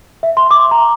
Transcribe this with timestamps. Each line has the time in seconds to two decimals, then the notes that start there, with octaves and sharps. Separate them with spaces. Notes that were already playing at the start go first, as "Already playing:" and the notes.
0.23 E5
0.37 C6
0.51 D6
0.71 A#5